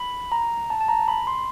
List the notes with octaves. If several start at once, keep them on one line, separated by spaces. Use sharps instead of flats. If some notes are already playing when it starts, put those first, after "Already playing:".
Already playing: B5
A#5
A5
A5
A#5
B5
C6